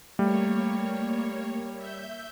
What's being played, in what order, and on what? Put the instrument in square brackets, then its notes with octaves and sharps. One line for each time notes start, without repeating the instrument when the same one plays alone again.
[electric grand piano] G3 [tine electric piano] A3 [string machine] A#3 C#5
[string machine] E5 G6